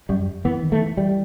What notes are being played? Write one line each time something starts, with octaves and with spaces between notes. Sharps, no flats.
F#2 G3
E3 B3
D#3
A3
E3
G3